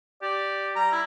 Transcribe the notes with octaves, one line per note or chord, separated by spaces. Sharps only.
G4 D5
G3 A#5
E4